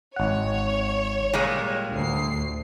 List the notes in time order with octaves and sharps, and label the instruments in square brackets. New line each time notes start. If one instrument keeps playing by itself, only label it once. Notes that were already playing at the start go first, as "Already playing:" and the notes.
[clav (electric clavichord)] G#1 F#5 [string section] C#5
[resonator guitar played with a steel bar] A#2 G3 G#3 [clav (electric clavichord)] G4
[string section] D2 A2 C7